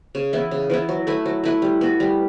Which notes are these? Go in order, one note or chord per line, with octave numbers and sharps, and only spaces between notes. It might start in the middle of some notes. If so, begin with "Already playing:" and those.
C#3
E3 B3 E4
C#3
E3 B3 E4
F#3
A3 E4 B4
F#3
A3 E4 B4
G3
B3 F#4
G3